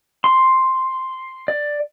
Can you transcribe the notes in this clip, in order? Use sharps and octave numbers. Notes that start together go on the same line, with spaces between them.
C6
D5